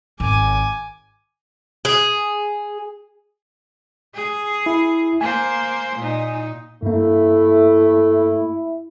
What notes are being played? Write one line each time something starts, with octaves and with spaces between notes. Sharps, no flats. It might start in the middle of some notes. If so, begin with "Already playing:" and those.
G#1 G#5 D6
G#4
G#4
E4
A#3 C5 G#5
A#2 D#4
G2 A3 A#3 E4